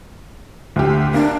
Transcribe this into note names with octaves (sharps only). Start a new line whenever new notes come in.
D2 G4
A#3 D4